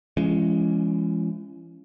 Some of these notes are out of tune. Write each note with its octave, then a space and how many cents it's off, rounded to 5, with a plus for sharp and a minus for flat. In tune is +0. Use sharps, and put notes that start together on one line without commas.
E3 +40 G#3 +0 C#4 +0